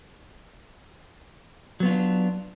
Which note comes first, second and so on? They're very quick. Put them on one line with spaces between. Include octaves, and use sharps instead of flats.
F#3 B3 F4 C4 D4